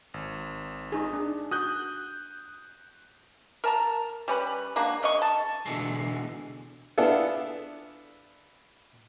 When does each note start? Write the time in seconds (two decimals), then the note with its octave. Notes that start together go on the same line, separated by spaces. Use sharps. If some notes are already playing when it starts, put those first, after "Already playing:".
0.14 G#1
0.92 D#4 G#4
1.13 D4
1.51 F#4 D#6 F#6 G6
3.64 A#4 A5 A#5
4.28 G3 C#4 B4
4.76 G#3 A#3 D4 F#4
5.03 C#3 D#5 C#6
5.22 A5
5.66 B2 D3 E3 G#3
6.98 B3 D4 E4 F4 G#4 A4